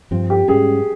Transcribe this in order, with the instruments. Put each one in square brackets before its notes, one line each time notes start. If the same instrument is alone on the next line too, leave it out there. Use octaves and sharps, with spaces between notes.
[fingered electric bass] G2 F3 C4
[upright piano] G4
[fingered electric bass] G#2 G3 C#4 [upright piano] G#4